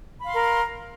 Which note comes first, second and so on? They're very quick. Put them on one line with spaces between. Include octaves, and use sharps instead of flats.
B5 F5 C6 A#4